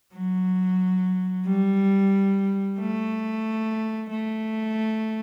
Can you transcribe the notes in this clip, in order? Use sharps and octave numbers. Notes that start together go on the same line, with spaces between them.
F#3
G3
A3
A3